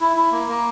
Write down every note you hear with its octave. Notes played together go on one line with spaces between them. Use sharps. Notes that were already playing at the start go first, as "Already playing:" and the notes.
E4
E4
A#3
A#3